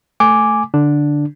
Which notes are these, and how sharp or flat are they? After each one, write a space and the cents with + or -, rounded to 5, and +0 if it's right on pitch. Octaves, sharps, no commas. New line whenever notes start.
A3 +0 G#5 +0 D6 +0
D3 +0 D4 +0